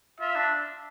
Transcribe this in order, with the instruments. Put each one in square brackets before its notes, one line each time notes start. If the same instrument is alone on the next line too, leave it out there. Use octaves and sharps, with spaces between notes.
[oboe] F4 [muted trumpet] E5
[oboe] D4